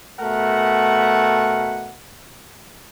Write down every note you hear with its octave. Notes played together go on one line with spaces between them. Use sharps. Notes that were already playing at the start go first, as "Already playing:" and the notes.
B2 A3 A#4 F#5